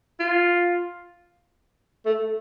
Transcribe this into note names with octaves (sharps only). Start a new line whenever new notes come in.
F4
A3